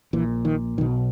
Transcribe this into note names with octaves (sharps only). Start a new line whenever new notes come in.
A#1 A#2 E3
D#3
B1 B2 D#3